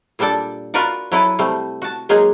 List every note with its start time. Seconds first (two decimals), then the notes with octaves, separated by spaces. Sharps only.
0.19 A#2 G3 D4 A4 D5
0.74 F4 F#4 A#4 B4 D5 F#5
1.12 F#3 E4 A4 B4
1.39 C3 G3 A3
1.82 F#4 A5
2.09 F#3 G#3 A#3 D#4 G#4